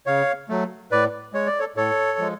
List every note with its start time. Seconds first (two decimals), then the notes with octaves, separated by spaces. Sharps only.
0.06 C#3 C#5 F5
0.49 F#3 A3
0.91 A2 B4 D5
1.33 G#3 C#5
1.46 D5
1.59 A4 C#5
1.76 A2 A4 C#5
2.19 F3 G#3